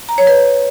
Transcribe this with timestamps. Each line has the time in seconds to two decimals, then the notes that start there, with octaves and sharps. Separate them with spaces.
0.09 A#5
0.18 C#5
0.27 B4